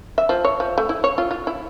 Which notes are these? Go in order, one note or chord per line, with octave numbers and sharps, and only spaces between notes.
E5
F3
C#5
F3
A3
E4
C#5
F4
F4
E4